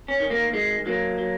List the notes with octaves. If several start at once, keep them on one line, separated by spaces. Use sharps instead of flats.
C#4
D#3
A#3
D#3 G#3
F#3 A#3
F#3